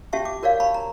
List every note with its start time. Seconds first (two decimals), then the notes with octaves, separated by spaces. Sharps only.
0.13 C#4 F#4 G4 E5 A5 C#6
0.25 D6
0.43 F#4 A#4 C#5 D5 F5
0.60 A5 B5 C#6
0.74 A#5